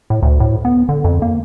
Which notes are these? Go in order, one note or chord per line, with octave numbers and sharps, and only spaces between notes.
A2
D2
A2
B3
D3
F2
A#3